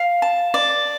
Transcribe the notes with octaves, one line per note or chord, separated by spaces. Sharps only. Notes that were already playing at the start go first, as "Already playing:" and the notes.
Already playing: F5
A5
D5